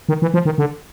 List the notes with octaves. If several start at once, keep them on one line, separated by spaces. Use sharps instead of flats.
D#3
E3
F3
D#3
D3